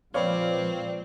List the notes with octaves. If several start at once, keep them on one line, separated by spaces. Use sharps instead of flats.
A#2 F3 G#3 C4 B4 C#5 D5 F5